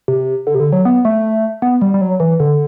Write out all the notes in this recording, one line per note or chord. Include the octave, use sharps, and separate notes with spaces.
C3
D3
C3
D3
F#3
B3
A3
B3
G3
G3
F#3
E3
D3